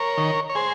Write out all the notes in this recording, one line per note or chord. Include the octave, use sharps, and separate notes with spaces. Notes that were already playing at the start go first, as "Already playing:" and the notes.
Already playing: A#4 C#5
D#3
C#5
G#4 C5